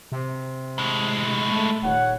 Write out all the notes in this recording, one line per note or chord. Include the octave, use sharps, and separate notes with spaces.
C3
A2 G#3
A3
D#1 C#5 F#5